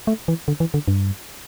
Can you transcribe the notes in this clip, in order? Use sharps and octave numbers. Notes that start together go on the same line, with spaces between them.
A3
E3
D3
E3
D3
G2